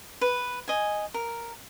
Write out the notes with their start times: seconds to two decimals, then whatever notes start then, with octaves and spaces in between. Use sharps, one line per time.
0.21 B4
0.68 D#5 G#5
1.14 A#4